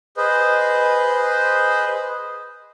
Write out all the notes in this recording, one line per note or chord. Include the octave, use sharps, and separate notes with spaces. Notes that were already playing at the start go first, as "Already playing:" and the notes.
G#4 B4 C5 D#5